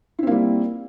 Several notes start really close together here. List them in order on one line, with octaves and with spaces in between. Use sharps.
E4 C4 A#3 G3